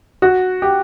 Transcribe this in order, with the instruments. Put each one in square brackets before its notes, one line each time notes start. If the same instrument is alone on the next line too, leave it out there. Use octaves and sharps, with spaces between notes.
[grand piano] F#4
G4